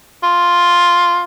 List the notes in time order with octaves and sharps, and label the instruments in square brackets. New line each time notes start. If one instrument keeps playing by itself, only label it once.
[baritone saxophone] F4